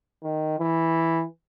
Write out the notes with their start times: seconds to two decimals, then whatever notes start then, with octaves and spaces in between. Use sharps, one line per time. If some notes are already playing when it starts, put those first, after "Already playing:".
0.23 D#3
0.59 E3